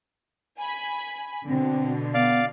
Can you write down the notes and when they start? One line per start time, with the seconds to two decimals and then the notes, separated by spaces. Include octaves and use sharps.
0.59 G#5 B5
1.47 B2 D3 C4
2.14 B3 D5 F5